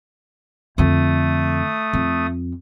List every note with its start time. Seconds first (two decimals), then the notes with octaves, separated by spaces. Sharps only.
0.78 F2 D3 A3 D#6
1.94 F2